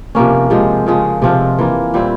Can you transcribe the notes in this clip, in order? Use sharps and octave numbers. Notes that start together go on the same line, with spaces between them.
C3 F3 A#3 C#4
C3 F3 G#3 C4
C#3 F3 G#3
C3 F3 C4 F4
E3 A#3 F4
A#2 G3 C4 E4